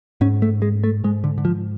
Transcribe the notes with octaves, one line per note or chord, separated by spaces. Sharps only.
G#2 C#4
A3
G#3
A3
G#2 G#3
D3
D3
F3